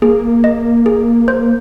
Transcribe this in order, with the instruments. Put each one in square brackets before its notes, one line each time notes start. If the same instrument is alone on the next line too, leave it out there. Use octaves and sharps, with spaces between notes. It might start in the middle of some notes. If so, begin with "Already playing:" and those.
[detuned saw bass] A#3 [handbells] G#4
[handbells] D#5
G#4
C5